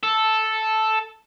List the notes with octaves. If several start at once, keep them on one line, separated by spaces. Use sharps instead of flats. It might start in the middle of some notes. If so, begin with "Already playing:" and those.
A4